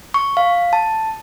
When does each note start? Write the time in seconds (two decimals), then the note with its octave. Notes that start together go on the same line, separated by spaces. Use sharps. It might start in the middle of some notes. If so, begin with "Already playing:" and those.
0.14 C#6
0.37 F5
0.73 A5